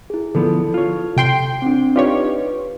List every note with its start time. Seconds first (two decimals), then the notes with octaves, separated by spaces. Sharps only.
0.10 E4 G#4
0.35 D3 F3 B3 A4
0.74 F4 C#5
1.16 C3 G5 C6
1.62 C4 D4
1.96 D#4 F4 G4 B4 C#5 D5